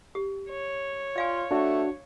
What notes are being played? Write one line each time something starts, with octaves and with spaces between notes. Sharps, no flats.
G4
C#5
F4 D5 F5 G#5
A3 D4 F#4